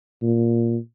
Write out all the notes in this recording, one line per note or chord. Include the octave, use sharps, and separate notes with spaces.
A#2